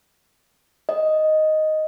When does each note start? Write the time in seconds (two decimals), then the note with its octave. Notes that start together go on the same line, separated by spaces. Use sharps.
0.89 D#5